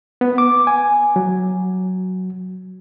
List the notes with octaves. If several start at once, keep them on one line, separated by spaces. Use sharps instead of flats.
B3
D6
G#5
F#3